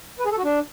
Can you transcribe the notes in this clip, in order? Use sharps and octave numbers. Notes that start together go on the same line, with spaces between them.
B4
G#4
A4
F#4
D4